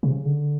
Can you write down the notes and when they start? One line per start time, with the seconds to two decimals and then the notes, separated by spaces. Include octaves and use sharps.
0.03 C3
0.10 C#3
0.25 D3